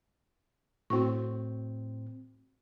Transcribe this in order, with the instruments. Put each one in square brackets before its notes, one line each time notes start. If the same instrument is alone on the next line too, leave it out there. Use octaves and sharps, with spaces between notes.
[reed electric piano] A2 C4 [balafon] F#4 C#6